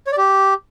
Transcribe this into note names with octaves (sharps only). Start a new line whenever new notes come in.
C#5
D5
G4